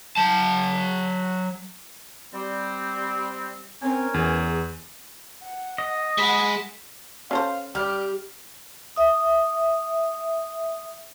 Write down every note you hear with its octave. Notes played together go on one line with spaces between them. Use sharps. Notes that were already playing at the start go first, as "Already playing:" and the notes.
F#3 A5
G3 C4
C4 C#4 A#4 G#5
E2 G#4
F#5
D#5
G#3 F#5 B5 A#6 B6 E7
C#4 A4 C5 F5
G3 G4 F6
E5 D#6